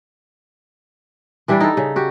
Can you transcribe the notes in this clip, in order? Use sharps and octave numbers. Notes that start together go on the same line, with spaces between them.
E3 G3 D4 E4
D#4 A4
C#3
F#4 G4